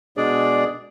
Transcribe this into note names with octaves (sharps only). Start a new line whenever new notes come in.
B2 G#3 D4 G#4 D5